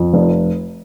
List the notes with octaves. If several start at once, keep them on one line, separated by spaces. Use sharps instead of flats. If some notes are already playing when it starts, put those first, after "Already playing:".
Already playing: F2
F1